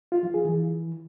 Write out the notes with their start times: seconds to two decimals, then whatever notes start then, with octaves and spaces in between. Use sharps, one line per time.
0.12 F4
0.23 F3
0.34 G#4
0.45 E3